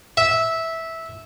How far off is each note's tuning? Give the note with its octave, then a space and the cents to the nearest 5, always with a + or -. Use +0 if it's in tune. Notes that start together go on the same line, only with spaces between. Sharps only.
E5 -10